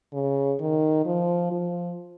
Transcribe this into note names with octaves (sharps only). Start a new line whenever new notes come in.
C#3
D#3
F3
F3